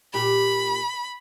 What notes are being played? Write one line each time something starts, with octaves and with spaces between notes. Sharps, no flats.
A#2 G4 B5